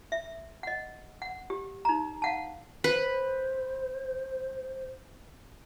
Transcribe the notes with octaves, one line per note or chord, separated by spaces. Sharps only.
E5
D#5 F#5
F#5
G4
D#4 A#5
F5 F#5 A5
B4 C5